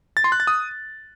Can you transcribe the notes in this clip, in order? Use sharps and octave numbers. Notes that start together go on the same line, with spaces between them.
A6
C6
F#6
A6
D#6